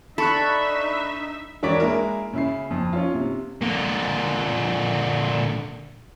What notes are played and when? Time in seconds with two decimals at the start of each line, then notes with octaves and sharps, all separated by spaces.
0.18 D4 D#4 A4 E5 B5 C#6 F#6
1.63 E1 D4 C#5 D6 B6 D7
1.80 G#3 A#3 E4 A#4
2.33 C#3 E4 C7
2.71 F2
2.93 C#4 F4
3.14 C3
3.61 A#2 D3